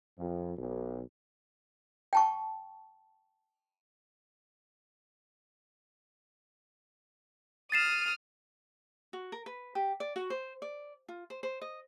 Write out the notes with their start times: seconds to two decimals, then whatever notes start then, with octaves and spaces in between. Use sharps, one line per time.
0.18 F2
0.58 B1
2.13 G5 A5 C#6
7.72 D#6 F6 A6 C7 E7
9.13 F#4
9.32 A#4
9.46 B4
9.75 G4
10.00 D5
10.16 F#4
10.30 C5
10.62 D5
11.08 F4
11.30 C5
11.43 C5
11.62 D#5